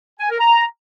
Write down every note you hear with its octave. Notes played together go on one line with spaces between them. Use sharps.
G#5
A#4
A#5